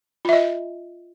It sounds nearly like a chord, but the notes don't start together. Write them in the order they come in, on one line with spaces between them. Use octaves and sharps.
F4 E5 D#5